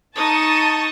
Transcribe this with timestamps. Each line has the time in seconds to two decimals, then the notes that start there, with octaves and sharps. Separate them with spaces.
0.16 D#4 A5 C#6 D#6